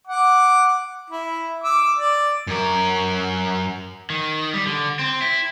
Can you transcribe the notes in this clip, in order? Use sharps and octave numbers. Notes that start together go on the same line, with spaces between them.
F#5 D6
E4
D6 E6
D5
F#2 A#4
D#3
G3
D3
C4
E4